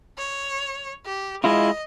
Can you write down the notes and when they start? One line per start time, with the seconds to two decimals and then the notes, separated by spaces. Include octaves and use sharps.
0.18 C#5
1.06 G4
1.44 G#3 E4 F4 D#5